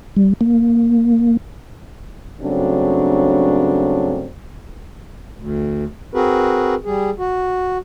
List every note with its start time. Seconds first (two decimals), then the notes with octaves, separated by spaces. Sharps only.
0.16 G3
0.41 A#3
2.41 G2 C#3 F#3 A3 C4 D4
5.37 D2
6.14 C4 F#4 G#4 A#4 B4
6.85 G3 G#4
7.19 F#4